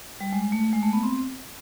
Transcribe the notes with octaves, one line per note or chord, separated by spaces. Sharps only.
G3
G#3
A3
G#3
A3
B3
C4